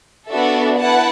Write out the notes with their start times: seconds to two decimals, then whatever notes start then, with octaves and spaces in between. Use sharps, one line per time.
0.28 B3 D4 F#4 A4 E5
0.77 E4 B4 F#5 A5